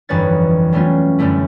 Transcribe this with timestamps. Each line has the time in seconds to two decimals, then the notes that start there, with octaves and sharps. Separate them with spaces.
0.09 G1 F2 E3 B4 C#5 A6
0.72 F#3 G3 A3 B3 C#4 F4
1.19 F#2 D3 G3 A3 E4